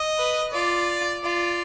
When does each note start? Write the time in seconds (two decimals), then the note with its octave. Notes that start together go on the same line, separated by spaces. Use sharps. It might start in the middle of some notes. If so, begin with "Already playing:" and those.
Already playing: D#5
0.17 B4
0.52 F4 D5
1.23 F4 D5